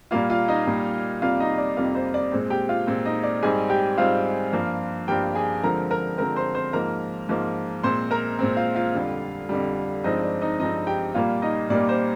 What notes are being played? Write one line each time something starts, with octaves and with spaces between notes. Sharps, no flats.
A#2 G3 A#3 F4 F5
F4 F5
D#4 D#5
A#2 G3 A#3
F2 C3 G3 A#3 F4 F5
D#4 D#5
D5
F2 C3 G3 A#3 F4 F5
C5
D5
A#2 G#3 C4
G4 G5
F4 F5
A#2 G#3 C4
D#4 D#5
D5
G#2 G3 C4 G#4 G#5
G4 G5
G#2 G3 C4 F4 F5
G2 F3 A#3
G2 F3 A#3 G4 G5
G#4 G#5
D3 F3 G#3 C4 A#4 A#5
A#4 A#5
D3 F3 G#3 C4 A#4 A#5
C5 C6
C5 C6
G#2 F3 A#3 A#4 A#5
G#2 F3 A#3
A#2 G#3 C4 C5 C6
A#4 A#5
A#2 G#3 C4
F4 F5
F4 F5
F2 D3 G3
F2 D3 G3
G2 F3 G#3 C4 D#4 D#5
D5
D#4 D#5
G2 F3 G#3 C4 D#4 D#5
G4 G5
A#2 G3 A#3 F4 F5
D#4 D#5
A#2 G3 A#3 D5
C5